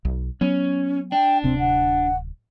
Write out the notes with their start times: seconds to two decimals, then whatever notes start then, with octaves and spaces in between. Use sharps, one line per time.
0.05 B1
0.41 F#3 B3 C#4
1.12 D4 G5
1.44 D1 C3 C4
1.59 F#5